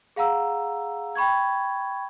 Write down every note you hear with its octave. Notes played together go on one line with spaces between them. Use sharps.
G#4 F5 F#5 A#5 E6
G5 B5 C#6 G#6